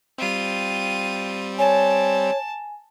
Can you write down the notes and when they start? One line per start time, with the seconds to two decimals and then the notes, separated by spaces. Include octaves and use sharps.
0.18 G3 C4 F4 D#7
1.59 C#5 G#5 A5